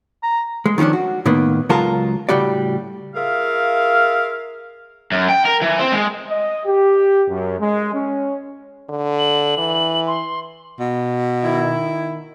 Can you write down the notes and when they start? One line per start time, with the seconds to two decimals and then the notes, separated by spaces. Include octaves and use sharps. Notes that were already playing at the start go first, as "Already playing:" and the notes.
0.23 A#5
0.66 G#3
0.78 D#3 F3 G3 C#4 D4
0.93 F#4
1.26 A2 D#3 A#3 B3
1.69 C#2 F#3 G#3 F4 A#4 A5
2.29 A2 C#3 G3 F#4 D5
3.15 F4 G#4 A#4 E5 F5
5.12 F#2
5.29 G5
5.45 A#4
5.62 E3
5.80 C4
5.93 G#3
6.30 D#5
6.66 G4
7.29 F#2
7.60 G#3
7.94 C#4
8.89 D3
9.19 F#7
9.58 E3
10.07 C6
10.80 B2
11.43 D#3 E4